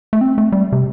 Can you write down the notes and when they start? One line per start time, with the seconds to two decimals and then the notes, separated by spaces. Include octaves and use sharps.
0.13 A3
0.21 C4
0.38 A3
0.52 G3
0.72 C3